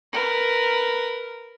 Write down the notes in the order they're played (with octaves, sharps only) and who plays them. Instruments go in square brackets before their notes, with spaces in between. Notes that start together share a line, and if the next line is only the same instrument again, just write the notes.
[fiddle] A#4 B4